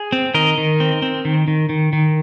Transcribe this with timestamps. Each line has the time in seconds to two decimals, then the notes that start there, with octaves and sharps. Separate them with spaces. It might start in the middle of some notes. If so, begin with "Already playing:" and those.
Already playing: G#4
0.12 C4
0.34 D#3 A#4 D#5
0.58 D#3
0.80 C4
1.02 C4
1.25 D#3
1.48 D#3
1.69 D#3
1.93 D#3